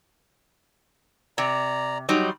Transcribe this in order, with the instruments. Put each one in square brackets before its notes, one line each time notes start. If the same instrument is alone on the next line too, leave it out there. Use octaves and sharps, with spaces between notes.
[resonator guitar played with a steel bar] C3 [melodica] D5 A#5
[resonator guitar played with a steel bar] F#3 G3 D#4 [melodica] C6